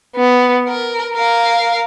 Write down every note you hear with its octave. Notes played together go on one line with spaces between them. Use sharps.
B3
A#4
A#4 F5